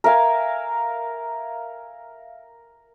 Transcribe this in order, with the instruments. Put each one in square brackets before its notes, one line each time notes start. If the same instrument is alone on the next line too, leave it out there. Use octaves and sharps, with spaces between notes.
[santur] A#4 E5 F5 G#5